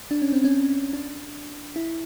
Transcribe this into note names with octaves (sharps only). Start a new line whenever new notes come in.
D4
C#4
C4
C#4
D4
E4